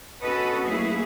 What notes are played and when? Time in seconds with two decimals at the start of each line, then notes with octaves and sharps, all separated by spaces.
0.22 B3 C#4 F#4 A4 B4 D#5
0.66 F#3 A3 A#3 E4 G#4